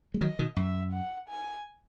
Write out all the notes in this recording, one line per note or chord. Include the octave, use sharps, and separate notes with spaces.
G#3
D#3 F#3 D#5
B2 D#3
F#2 E5
F#5
G#5